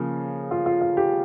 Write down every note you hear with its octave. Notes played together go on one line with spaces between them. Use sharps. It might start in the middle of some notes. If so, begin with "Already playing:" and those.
Already playing: C#3 F3 A#3
F4
F4
F4
G4